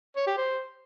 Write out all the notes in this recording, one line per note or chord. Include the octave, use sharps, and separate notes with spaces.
C#5
G4
C5